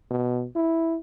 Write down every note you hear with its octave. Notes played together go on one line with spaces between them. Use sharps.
B2
E4